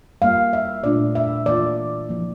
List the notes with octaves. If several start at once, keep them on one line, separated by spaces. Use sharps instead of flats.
G3 A#3 F4 F5
E5
A#2 A3 D4 F4 D5
E5
E3 A#3 F4 D5
F3 A#3 E4